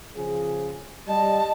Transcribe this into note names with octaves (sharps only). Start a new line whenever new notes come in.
C#3 F3 G#4
G3 D#5 A5